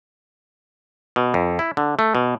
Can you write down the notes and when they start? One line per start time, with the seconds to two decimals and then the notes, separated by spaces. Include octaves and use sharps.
1.16 B2
1.34 F2
1.59 E4
1.77 D3
1.99 A3
2.15 B2